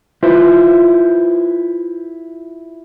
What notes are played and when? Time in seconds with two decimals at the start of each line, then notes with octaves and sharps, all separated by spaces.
0.23 E4 F4 B4 C5